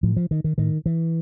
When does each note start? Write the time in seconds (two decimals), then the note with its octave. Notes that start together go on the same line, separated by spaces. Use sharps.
0.03 A2 F3
0.16 F3
0.31 D#3
0.44 D#3
0.58 A2 D#3
0.86 E3